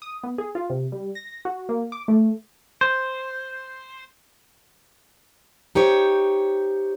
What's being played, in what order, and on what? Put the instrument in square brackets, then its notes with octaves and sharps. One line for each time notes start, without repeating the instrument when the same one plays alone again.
[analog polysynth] D#6
B3
G#4
F4
C3
G3
A#6
F#4
A#3
D6
A3
[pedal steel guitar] C5
[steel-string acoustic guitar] D#4 G4 C5 C#5